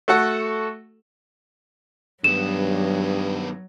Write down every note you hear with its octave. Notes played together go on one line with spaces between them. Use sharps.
A3 F#4 A4 F#5
G2 D#3 F#3 B3 E7